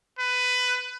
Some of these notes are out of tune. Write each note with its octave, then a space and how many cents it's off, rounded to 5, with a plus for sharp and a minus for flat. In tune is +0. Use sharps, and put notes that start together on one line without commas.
B4 +15